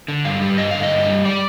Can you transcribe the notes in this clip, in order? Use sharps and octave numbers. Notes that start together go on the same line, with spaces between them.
D3
G2 F5
G3
G2 D#5
D3 F5
D#5
G2
G3
D5